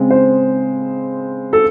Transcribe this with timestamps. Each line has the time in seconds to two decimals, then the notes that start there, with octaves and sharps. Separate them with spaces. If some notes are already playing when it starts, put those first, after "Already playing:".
Already playing: C#3 G#3 C4
0.11 C5
1.53 A4